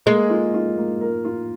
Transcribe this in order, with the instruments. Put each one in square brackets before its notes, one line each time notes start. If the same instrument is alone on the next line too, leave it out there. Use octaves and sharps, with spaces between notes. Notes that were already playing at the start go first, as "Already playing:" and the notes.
[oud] G#3 [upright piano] A#3
[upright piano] F4
F4
A#3
A#4
F4